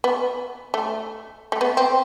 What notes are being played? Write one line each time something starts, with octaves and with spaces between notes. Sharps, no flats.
B3
A3
A3
B3
C4